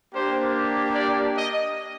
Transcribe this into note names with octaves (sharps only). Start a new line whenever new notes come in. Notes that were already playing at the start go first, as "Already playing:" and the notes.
A#3 D4 G4 C5
D5
D#5